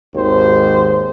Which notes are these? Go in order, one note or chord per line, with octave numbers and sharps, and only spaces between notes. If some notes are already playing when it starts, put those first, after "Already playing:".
G#1 D#2 C5